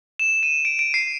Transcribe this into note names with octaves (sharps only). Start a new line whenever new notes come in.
E7
D#7
D7
D7
C7